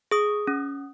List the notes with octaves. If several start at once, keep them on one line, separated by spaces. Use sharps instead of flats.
G#4 D#6
C#4